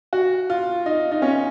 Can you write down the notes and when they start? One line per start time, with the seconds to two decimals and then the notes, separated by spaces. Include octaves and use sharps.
0.13 F#4
0.50 F4
0.86 D#4
1.12 D#4
1.22 C#4